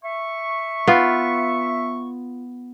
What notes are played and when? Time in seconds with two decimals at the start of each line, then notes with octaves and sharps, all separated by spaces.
0.04 E5 C#6
0.87 B3 F4